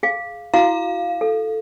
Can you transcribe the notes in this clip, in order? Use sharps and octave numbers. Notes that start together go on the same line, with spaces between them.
G#4 F5
E4 F#4 F5
A4